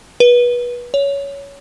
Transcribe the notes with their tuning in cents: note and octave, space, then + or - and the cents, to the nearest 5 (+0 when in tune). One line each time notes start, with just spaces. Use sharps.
B4 -25
C#5 +15